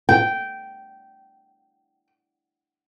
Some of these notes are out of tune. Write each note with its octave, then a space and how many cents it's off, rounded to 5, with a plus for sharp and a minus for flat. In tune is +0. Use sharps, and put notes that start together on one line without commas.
G5 -15